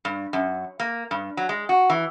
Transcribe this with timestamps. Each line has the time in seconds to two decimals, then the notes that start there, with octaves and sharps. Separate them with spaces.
0.05 G2
0.33 F#2
0.80 A#3
1.11 G2
1.37 F#3
1.49 G#3
1.69 F#4
1.90 E3